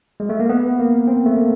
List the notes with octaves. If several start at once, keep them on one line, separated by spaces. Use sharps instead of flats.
G#3
A3
A#3
B3
A#3
C4
A3
A#3